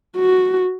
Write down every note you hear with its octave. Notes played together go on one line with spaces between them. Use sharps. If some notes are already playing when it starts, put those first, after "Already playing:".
F#4